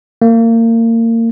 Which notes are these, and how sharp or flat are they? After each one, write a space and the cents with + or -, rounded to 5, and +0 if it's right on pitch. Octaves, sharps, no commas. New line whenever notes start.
A#3 -30